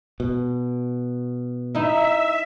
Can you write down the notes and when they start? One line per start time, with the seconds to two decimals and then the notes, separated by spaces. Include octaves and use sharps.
0.20 B2
1.75 D#4 E4 E5